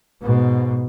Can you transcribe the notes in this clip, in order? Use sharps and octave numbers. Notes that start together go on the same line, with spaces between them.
G#2 B2